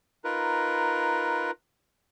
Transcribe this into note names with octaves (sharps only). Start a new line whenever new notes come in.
D#4 F4 A#4 B4